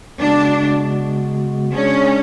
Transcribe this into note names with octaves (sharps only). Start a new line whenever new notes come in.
C#3 G#3 B3 D4 F#4
G#3 C#4 D4 G#4 D5